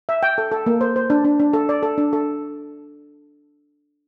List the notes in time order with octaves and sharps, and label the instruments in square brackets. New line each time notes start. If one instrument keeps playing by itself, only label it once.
[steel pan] E5
G5
A4
A4
A#3
C5
C5
D4
D4
D4
A4
D5
A4
D4
A4